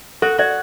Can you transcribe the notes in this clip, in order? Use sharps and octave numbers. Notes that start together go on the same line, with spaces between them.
F#4 A4
F#4 D5